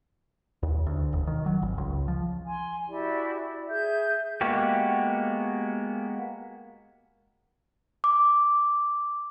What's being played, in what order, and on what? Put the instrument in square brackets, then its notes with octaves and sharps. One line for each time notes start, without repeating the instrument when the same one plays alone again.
[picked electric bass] D#2
D2
E1
D#3
F#3
G#1
C#2
F3
[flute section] G#5 C6
E4 F#4 G4 D5
G#4 E5 G6
[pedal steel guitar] G#3 A#3 B3 F#4 G4
[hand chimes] D6